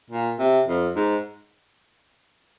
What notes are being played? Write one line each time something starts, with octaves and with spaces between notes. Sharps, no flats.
A#2
C3
F2
G#2